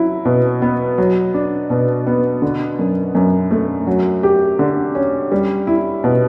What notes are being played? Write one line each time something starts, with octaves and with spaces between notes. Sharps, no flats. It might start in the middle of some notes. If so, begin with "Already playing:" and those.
Already playing: F#3 E4
B2
B3
F#3
D4
B2
B3
D3
F#2
F#2
A3
F#3
G4
D3
C#4
G3
E4
B2